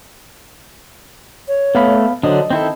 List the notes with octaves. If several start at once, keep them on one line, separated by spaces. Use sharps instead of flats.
C#5
A3 B3 F5 B5
D3 F#3 D4 C5 D#5
D#3 C4 E4 A4